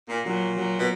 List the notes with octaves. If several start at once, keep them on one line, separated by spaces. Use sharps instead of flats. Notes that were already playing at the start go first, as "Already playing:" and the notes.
A#2
A#2 F#3
F#3
B2